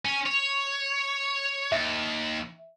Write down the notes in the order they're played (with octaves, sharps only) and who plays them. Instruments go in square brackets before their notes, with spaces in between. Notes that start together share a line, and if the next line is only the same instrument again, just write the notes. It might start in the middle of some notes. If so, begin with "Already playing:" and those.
[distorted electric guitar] C#4
C#5
[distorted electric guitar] D#2 [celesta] E5